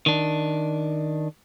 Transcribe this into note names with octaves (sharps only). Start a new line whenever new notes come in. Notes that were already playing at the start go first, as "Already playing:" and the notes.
D#3 D4